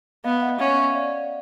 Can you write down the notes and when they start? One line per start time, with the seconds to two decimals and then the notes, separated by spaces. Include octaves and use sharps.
0.24 B3 D#5 F5
0.41 E5 F#5
0.59 C#4 E5 F#5
0.77 E5 F#5
0.90 F5
0.95 D5 E5